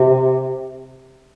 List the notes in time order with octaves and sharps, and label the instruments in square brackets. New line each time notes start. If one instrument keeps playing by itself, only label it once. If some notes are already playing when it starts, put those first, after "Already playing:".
Already playing: [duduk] C3